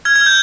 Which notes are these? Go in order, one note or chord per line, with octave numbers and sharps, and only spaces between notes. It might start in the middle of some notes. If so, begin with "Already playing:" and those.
F6 G#6
G#6
F6
G6